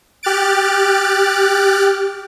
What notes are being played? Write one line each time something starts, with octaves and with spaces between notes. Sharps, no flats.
G4 F6 F#6 A6 D7